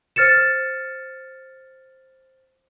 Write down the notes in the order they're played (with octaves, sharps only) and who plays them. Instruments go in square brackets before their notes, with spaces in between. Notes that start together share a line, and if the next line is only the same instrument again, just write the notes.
[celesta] C5 F6 A6 C#7 E7